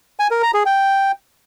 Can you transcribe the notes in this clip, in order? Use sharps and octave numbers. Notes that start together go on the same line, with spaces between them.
G#5
A#4
A#5
G#4
G5